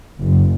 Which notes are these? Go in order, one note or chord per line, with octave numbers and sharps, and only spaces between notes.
F#1